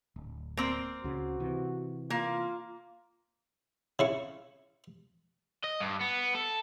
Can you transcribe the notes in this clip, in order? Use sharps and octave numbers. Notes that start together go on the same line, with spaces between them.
D1
A#3 C4
C#2 C#3 F#4
C3 E3
A#3 F4
C#3 E4 C#6
D#5
G2
B3
A4